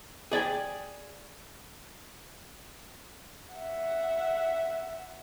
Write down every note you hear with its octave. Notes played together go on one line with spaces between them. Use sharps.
G#4 D5 G5 G#5
E5 F#5